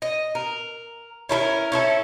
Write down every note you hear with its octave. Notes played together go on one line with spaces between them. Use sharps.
D#5
A#4
C#4 E4 A4 A#4
C#4 E4 A4